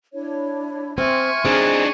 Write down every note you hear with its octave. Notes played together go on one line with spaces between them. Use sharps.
D4 E4 C#5
C4 E5 G#5 C6 C#6 F6
C4 D4 D#4 G#4